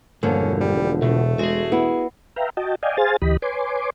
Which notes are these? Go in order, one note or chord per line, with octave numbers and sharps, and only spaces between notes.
E1 G2 D3 F3 A#3 C#4
G3
B2 A3
G#3 F#4 G#4
B3 E4
B4 E5 F5 G5 A#5
F#4 D#5 G5 A5
D5 D#5 F5 G5 G#5
G#4 C5 F5 G#5 A6
D2 E3 G4 D#5 B5
B4 C#5 G#5 C6 D6